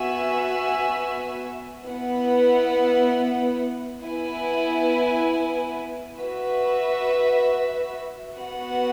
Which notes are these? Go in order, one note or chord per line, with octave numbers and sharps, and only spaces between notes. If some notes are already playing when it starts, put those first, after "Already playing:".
Already playing: B3 F#4 E5 G#5
B3 E4 B4 F#5
B3 E4 B4 G#5
F#4 B4 E5
B3 F#4 B4 F#5